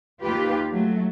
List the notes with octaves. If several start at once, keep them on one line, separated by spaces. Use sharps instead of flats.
D#2 F4 G4 B4
F#3 A3